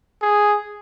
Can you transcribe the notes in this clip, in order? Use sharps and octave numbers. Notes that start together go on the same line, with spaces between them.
G#4